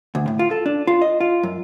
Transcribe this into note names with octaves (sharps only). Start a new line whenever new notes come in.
D2
A2
F4
A4
D4
F4
D#5
F4
F#2